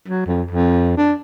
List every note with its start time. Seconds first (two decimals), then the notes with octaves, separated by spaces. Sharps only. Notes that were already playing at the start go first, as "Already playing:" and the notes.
0.08 F#3
0.26 F2
0.51 F2
0.97 D4